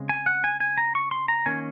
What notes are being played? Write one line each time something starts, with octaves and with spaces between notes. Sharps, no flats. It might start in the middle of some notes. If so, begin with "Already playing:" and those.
Already playing: C#3 G#3 C4
G#5
F#5
G#5
G#5
A#5
C#6
C6
A#5
D#3 A#3 C#4 G#5